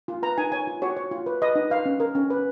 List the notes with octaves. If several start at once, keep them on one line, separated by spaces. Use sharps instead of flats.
F4
B4 A#5
D#4 G#5
C#5 G#5
F4
F#4 C#5
C#5
F4
B4
B4 D#5
D#4
B4 F5
C#4
A#4
C#4
B4